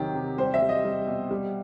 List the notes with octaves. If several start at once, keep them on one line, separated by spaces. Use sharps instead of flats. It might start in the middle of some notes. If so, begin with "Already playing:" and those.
Already playing: C3 D#3 F#3 G4
C3
G3 C5
E5
G3
D#5
G3
B2
G3